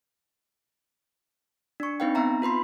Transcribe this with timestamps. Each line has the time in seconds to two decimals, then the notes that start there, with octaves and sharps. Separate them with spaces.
1.80 D4 C#6
2.00 C4 D#4 B4 F5 G5
2.15 B3 C4 E5 A#5
2.42 F4 B4 B5 C6